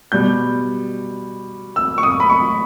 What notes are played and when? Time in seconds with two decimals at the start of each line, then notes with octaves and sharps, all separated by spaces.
0.12 B2 G3 G6
1.76 E6
1.98 C#6
2.03 D#6
2.20 B5
2.30 C#6